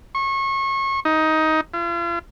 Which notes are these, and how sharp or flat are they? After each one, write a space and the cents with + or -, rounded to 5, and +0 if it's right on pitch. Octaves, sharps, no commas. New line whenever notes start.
C#6 -30
D#4 +15
F4 -40